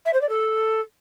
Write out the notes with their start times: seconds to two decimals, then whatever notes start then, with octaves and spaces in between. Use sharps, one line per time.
0.06 E5
0.13 C5
0.21 D5
0.29 A4